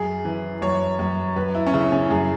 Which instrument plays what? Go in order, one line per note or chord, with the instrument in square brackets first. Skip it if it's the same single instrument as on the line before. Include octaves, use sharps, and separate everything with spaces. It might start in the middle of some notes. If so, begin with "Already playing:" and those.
Already playing: [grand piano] F#2 G#4
E3
F#2 C#5
F#2
F#2 B4
E4
C#4
C#3 E4
C#4
F#2 G#4